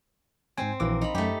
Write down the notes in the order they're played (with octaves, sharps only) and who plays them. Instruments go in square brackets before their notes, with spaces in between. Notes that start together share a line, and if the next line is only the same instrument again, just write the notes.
[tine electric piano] G#2 C5 G#5 [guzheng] C4
[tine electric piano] A#1 E3 D6 [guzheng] A#3
[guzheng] D#4 B5
[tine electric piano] F#2 [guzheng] A3 G4